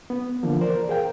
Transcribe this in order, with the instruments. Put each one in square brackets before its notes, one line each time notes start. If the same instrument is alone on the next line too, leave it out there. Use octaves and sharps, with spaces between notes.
[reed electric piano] B3
D3 E3 F3 A#3
A#4 C5 D5
G#4 A#4 F5 G5